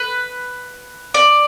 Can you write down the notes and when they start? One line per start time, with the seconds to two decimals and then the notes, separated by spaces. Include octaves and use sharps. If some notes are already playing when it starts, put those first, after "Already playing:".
Already playing: B4
1.14 D5